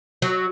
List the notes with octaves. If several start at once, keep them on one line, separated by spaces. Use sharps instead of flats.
F#3